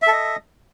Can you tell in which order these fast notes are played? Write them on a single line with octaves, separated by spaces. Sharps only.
E5 A4 D#5